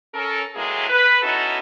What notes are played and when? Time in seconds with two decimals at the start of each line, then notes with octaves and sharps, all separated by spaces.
0.13 C#4 A4 A#4
0.55 A2 E3 F#3 G#3 A#3 G#4
0.89 B4
1.22 B3 C#4 D#4 E4 F#4 A4